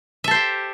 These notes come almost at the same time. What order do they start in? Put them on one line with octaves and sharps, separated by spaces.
E5 A4 C5 G4